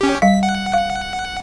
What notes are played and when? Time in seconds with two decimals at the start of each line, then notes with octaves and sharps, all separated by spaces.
0.01 C#4 G4
0.22 G3 F5 B6
0.43 F#5
0.73 F5